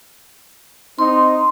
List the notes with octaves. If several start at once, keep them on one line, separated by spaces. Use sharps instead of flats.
C4 D#4 C6